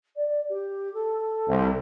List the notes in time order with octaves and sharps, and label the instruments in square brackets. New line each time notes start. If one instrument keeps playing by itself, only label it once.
[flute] D5
G4
A4
[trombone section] C2